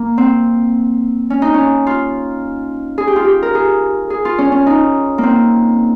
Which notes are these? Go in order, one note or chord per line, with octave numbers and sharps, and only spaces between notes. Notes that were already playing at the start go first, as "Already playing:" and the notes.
Already playing: A#3
C4
C#4
D#4
C#4
F4
G#4
G4
F4
G4
A#4
G#4
G#4
F4
C#4
C#4
D#4
A#3
C4